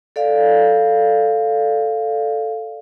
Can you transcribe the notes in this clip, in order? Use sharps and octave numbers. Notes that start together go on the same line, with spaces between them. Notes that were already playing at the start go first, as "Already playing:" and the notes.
A4 D5 F5